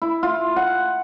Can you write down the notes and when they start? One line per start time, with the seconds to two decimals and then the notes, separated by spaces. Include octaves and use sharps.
0.02 E4
0.23 F4
0.56 F#5